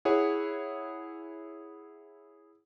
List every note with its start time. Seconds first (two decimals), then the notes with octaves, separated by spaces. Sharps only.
0.05 E4 G#4 C#5 F#5